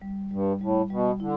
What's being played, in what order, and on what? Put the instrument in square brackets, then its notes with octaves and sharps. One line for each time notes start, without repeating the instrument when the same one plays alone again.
[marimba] G3
[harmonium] G2 [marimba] G3
[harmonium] A2 [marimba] G3
[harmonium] B2 [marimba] G3
[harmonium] D3 [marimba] E4